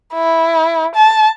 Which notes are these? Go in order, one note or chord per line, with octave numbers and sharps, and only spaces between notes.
E4
A5